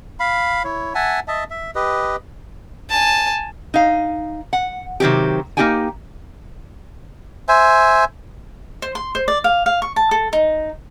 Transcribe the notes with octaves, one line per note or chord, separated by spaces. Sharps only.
F5 B5
E4 C#5
E5 F#5 G#5 A5
D#5 E5 A5
E5
G4 B4 D#5
G#5 A5
D#4 F5
F#5
C3 D#3 F#3 C4 G4
A#3 D4 D#4 G4 G5 G#5
C5 E5 G#5
C5
C6
C5
D5
F5
F5
C#6
A5
A4
D#4